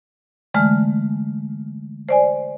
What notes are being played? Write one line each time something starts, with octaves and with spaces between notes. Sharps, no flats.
D3 E3 G#3 A3 F6
C5 D5 G#5